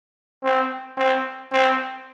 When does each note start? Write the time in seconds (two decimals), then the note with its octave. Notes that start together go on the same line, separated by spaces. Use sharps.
0.43 C4
0.97 C4
1.52 C4